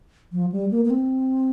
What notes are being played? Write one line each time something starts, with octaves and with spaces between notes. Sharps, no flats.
F3
G3
A#3
A#3
C4